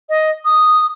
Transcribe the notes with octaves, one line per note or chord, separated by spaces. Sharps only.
D#5
D#6